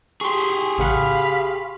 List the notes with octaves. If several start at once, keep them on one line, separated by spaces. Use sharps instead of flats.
G4 G#4 C6 C#6
A1 C#3 F5 F#5 B5